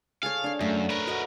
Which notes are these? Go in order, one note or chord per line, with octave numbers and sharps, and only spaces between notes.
G#4 A4 C#5 F5
D4 C#5
F#2 A3
A#4 B4 C#6
F#4 D#5 F#5